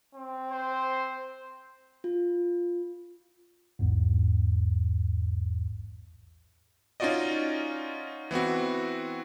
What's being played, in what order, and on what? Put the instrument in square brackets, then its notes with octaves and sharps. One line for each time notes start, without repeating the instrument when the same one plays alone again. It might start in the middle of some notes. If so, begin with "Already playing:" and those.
[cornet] C4
[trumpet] C5
[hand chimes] F4
[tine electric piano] A#1 E2 G#2
[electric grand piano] C#4 D#4 F4 F#4 D5 D#5
E3 B3 C4 F#4